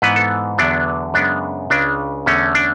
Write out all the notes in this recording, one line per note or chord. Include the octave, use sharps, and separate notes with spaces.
G#2 E3 B3 B4
A4
E2 D3 F#3 B3 D4
F#2 C#3 G#3 B3 D4
C#2 C#3 G#3 D4
E2 D3 A3 C#4
D4